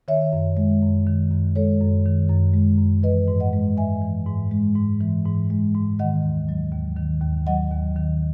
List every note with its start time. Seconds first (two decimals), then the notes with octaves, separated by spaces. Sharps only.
0.08 D#3 C#5 E5
0.33 F#2
0.57 G#3
0.82 F#2
1.07 D#3
1.31 F#2
1.56 G#3 A4 C#5
1.81 F#2
2.05 D#3
2.29 F#2
2.54 G#3
2.78 F#2
3.03 E3 B4 D#5
3.28 G#2
3.40 D#5 F#5
3.53 G#3
3.77 G#2 E5 G#5
4.02 E3
4.27 G#2
4.51 G#3
4.75 G#2
5.01 E3
5.26 G#2
5.50 G#3
5.74 G#2
5.99 D#3 D#5 F#5
6.23 D#2
6.49 F#3
6.72 D#2
6.97 D#3
7.21 D#2
7.47 F#3 D#5 F#5
7.71 D#2
7.96 D#3